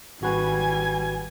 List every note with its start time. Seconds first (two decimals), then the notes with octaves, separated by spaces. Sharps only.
0.21 G#1 G3 F#4 B4 G#5